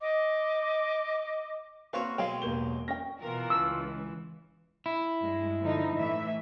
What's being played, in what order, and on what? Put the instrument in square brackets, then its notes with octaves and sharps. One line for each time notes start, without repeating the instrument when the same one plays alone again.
[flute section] D#5 D6
[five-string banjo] A#3 C4 B4 [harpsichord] F#4 C#5 F5
[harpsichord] B2 F#3 G#3 [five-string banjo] F5 G5
[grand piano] E1 A#3 G7 [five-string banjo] G4
[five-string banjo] C#4 G5 [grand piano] A#6
[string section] B2 A#4 [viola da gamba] E3 [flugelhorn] F4
[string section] C#2 [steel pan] E6
[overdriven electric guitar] E4
[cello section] G2 G#3
D3 F3 D#4
A2 E3 E5